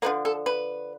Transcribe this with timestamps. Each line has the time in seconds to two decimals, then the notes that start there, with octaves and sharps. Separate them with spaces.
0.02 D3 F3 A#3 B4
0.25 A4
0.46 B4